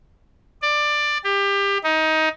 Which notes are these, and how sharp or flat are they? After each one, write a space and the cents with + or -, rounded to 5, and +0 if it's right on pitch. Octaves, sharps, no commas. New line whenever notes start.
D5 +15
G4 +25
D#4 +20